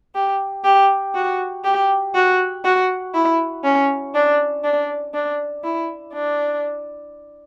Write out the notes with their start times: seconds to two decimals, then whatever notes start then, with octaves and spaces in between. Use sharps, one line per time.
0.15 G4
0.64 G4
1.15 F#4
1.64 G4
2.14 F#4
2.64 F#4
3.14 E4
3.64 C#4
4.15 D4
4.64 D4
5.14 D4
5.64 E4
6.13 D4